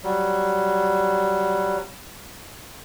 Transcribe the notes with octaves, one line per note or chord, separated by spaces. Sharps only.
F#3 G3